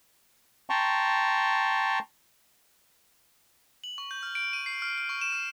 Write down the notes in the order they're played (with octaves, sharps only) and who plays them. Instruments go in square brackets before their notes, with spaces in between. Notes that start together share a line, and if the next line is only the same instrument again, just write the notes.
[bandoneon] G5 A5 A#5 C6 C#6
[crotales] F#7
C#6
G6
F6
D7
D#7
C7
F6
F6
C#6
E7
F6